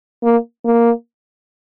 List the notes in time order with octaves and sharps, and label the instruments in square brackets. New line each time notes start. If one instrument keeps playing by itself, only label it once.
[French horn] A#3
A#3